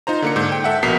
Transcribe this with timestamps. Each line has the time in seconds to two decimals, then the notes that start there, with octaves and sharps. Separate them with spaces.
0.07 D#4 F4 C5 A#5
0.22 D3 A#3 C#7
0.36 G#2 D3 G6
0.52 G5
0.64 A4 E5 F#5
0.83 A#1 B2 A#4 B6 C7